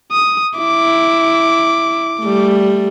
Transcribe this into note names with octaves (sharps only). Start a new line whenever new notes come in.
D#6
E4 D6
G3 A3